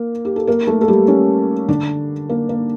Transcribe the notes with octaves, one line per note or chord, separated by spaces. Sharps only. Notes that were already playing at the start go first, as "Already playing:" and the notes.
Already playing: A#3 A#4
G4
A4
A#3 A#4
A3 A4
A4
G3 G4
C#4
D3 D4
A#3
A#3